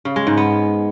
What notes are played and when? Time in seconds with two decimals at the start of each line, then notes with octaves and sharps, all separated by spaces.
0.05 C#3
0.16 G#3
0.27 G#2
0.37 B3